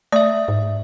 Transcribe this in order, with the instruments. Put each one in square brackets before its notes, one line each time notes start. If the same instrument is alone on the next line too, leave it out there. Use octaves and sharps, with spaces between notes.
[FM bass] A3 [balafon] D5 [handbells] E5 D#6
[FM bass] G#2